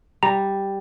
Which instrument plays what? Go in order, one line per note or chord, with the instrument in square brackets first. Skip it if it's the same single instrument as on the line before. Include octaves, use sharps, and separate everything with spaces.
[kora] G3 [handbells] A#5